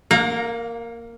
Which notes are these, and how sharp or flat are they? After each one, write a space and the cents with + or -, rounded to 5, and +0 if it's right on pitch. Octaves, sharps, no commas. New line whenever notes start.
A#3 -5 F5 +40 A#5 +0